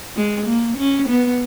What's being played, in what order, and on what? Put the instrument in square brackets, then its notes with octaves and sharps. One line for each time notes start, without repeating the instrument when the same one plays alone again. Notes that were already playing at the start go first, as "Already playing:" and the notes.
[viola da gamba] G#3
A#3
C#4
B3